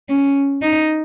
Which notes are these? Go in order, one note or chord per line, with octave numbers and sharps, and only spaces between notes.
C#4
D#4